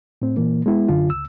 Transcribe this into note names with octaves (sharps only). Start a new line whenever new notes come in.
A2 C4
A#2 E3 A#3
G#3 B3 E4
F#2 D3 F4
C#2 E6